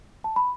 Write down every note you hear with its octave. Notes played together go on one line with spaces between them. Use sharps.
A5
B5